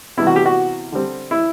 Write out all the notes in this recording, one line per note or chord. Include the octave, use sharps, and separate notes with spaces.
C3 E3 G3 B3 E4
F#4
G4
F#4
D3 G3 C4
E4